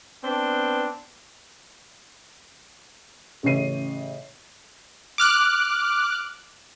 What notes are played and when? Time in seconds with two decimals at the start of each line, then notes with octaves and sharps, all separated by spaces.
0.23 B3 C4 D4
3.43 A1 C#3 C#5 E5 C7 D#7
5.18 D6 F6 F#6